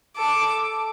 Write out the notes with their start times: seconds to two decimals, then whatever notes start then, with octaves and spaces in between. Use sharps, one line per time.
0.17 A4 D6